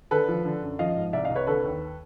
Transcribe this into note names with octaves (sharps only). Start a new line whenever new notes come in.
D3 A4 B4
F3
D3
F#2
F3 D#5 F5
G#2
C2 D5 E5
D#5 F5
C2
B4 C#5
D3 A4 B4
D#2